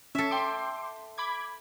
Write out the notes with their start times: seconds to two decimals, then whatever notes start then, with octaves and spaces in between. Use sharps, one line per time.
0.15 C#4 A4 E5
0.31 G5 C6 D6
1.18 B5 D6 G#6